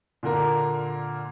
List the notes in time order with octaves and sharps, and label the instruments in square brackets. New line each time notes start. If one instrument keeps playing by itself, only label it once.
[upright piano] A#2 D3 A#3 A#4